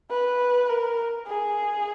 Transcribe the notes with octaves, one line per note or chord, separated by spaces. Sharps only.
B4
A#4
G#4